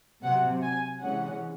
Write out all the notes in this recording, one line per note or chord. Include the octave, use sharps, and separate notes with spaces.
C3 F#3 C4 F#5
G#5
C3 E3 G#3 C#4 F#5